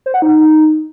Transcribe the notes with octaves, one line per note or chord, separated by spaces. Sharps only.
C5
F#5
D#4